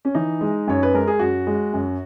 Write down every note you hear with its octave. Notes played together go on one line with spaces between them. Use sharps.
C#4
E3 D#4
G#3
F#2 C#5
B4
G#3 A#4
G#4
F#2 F#4
G#3
F#2